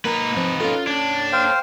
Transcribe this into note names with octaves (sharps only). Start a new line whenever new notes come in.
A#3 D#4 A#4 B4 A#5
F3 C4
C#4 F4 A4 F5
D4 C#5 A5
C5 F5 G5